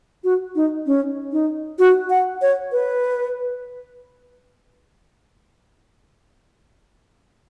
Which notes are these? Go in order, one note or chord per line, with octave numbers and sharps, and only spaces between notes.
F#4
D#4
C#4
D#4
F#4
F#5
C#5
B4